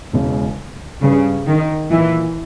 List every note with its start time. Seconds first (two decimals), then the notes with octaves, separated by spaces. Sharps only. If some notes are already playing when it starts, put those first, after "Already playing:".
0.13 E1 E2 C#3 G#3 C#4
1.02 G2 C#3 G3 C#4 G#4 B4
1.47 D#3
1.91 A#2 E3 A#3 E4